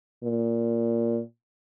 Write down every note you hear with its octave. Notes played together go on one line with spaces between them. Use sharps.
A#2